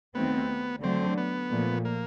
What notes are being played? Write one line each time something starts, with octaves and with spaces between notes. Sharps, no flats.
D#2 D#3 F#3 A3 B3 C4
D3 F#3 A3 C4
B3
A#2 F3 A3
A#3